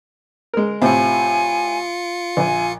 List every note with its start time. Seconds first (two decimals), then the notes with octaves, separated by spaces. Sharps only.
0.54 G#3 A#4
0.82 A2 C3 C4 F4 G#5 C#7
2.37 A#1 G#5